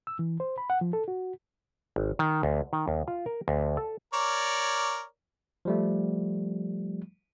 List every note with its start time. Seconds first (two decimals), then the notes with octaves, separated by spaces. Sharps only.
0.07 E6
0.19 E3
0.40 C5
0.58 B5
0.70 F#5
0.81 F3
0.93 A4
1.08 F#4
1.96 G#1
2.19 D#3
2.43 D2
2.73 D#3
2.88 D#2
3.08 F4
3.26 A#4
3.48 D2
3.77 A4
4.14 A#4 C#5 D5
5.65 F3 G3 A3